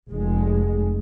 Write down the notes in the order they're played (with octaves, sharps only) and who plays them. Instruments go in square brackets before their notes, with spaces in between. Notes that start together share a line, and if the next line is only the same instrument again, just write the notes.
[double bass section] F1 G#3